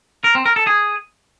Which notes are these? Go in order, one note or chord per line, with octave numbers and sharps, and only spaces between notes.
A#4
C4
A#4
A4
G#4